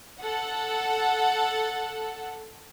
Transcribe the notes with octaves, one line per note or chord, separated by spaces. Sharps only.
A4 F#5